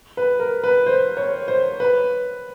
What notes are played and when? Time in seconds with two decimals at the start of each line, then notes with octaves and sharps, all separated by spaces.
0.17 B4
0.40 A#4
0.64 B4
0.86 C5
1.17 C#5
1.48 C5
1.80 B4